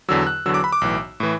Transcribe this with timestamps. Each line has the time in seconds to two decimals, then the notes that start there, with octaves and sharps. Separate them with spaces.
0.08 E2 D3 F#3 E6
0.27 F#6
0.46 E2 D3 F#3 E6
0.54 D6
0.64 B5
0.72 D6
0.81 B1 A2 E3
1.20 A2 E3